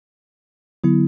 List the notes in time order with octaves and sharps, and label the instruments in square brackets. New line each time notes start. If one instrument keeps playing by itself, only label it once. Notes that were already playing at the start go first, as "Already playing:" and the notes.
[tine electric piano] D3 F#3 B3 E4